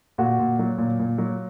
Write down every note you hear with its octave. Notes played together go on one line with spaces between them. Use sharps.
A#2 F#4
A#2
F#3
A#2
A#2
F#3